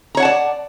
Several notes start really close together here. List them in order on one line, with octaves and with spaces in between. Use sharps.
A#5 C#5 F#5 A5 D5